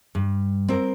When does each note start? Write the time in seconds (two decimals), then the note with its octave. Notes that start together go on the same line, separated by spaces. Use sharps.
0.15 G2
0.68 C4 A#4